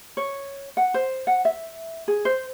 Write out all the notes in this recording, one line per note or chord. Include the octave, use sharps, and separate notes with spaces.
C#5
F#5
C5
F#5
E5
G#4
C5